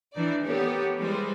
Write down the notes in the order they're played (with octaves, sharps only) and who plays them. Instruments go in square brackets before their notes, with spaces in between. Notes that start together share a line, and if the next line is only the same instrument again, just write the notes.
[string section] E3 D4 D#4 D5
B3 G4 A4 A#4 C#5
E3 G3 G#3 B4 C5